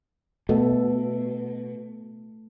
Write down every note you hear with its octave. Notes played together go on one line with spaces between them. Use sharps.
B2 A3 A4